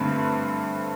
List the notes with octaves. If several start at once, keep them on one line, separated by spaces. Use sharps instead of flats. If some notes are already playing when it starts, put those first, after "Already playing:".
Already playing: G2 D3 A3 C4